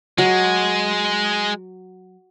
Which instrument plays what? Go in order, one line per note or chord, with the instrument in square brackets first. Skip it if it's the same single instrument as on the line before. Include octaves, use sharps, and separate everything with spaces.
[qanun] F#3 [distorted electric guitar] G#3